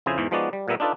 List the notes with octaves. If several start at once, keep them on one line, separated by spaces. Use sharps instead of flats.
F2 C#3 E4 G#4 C5 G#5
E2 G#2 E3
F3 G#3 B3 D#4 F#4 D5
G3
A#2 G3 B3 A#4 E5
D4 D#4 F4 A4 B4 D5